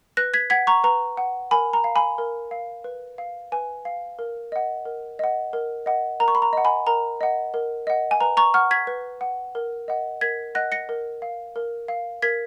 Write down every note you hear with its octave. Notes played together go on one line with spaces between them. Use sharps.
B4 F#6 A#6
G#6 B6
F#5 G#6 B6
A#5 C#6
B4 A#5
F#5
A#4 G#5 B5
A#5
F5
G#5 B5
A#4
F5
B4
F5
B4 G#5
F5
A#4
D#5 F#5
A#4
D#5 F#5
A#4
D#5 F#5
A#4 A#5
C#6
B5
A#5
D#5 F#5
G#5 B5
A#4 A#5
D#5 F#5
A#4
D#5 F#5
G#5
B4 A#5
A#5 C#6
F#5 C#6 F6
G#6 B6
B4
F#5
A#4
D#5 F#5
A#4 G#6 B6
D#5 F#5 F#6 A#6
A#6 C#7
A#4
F5
A#4
F5
A#4 G#6 B6